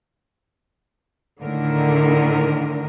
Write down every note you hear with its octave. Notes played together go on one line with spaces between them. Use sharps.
A2 D3 D#3 A#4